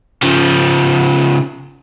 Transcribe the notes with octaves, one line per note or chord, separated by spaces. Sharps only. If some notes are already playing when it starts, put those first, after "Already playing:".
C#3 F3